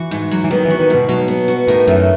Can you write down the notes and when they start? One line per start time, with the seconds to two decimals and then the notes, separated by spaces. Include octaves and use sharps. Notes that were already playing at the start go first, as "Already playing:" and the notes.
Already playing: E3 F#4
0.11 G#2
0.31 F#3
0.44 E3
0.51 D#3 B3
0.65 E3
0.70 F#4
0.80 D#3
0.90 G#2 B2
1.09 B2 F#3
1.28 B3
1.48 F#4
1.67 A2 D#3
1.87 F#2 A3